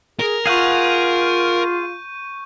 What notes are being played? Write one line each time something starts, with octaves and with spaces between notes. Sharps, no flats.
G#4 A#4
F4 G#4 F5 F#5 C#6 G6 D#7